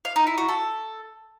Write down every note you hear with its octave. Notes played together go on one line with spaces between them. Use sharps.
F5
D#4
E4
F#4
A4